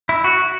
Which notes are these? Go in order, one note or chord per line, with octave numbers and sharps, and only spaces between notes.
E4
F#4